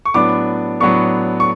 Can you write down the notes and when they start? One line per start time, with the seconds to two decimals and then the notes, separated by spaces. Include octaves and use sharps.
0.05 C#6
0.14 A2 F#3 B3 D4 D6
0.80 A2 F#3 B3 D4 C#6
1.40 C#6